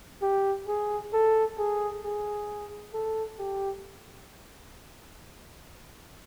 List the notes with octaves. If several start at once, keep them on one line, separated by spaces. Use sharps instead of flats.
G4
G#4
A4
G#4
G#4
A4
G4